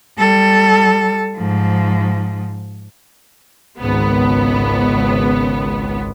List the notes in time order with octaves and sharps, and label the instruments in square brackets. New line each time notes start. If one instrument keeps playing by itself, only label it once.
[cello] G3 A4
G#2 F3
[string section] G#1 C#2 B3